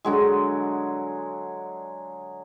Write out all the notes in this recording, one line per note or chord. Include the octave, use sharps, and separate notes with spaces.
D3 F#3 G#3